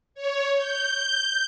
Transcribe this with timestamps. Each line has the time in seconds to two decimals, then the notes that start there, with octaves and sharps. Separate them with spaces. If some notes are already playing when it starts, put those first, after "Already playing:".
0.14 C#5
0.55 G6